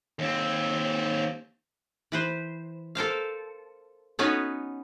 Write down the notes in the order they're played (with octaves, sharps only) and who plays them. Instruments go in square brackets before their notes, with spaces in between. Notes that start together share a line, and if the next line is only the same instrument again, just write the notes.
[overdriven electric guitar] D#2 C4
[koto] E3 B4 C5
A4 A#4 C5 F5
B3 C#4 D#4 F#4 B4 C#5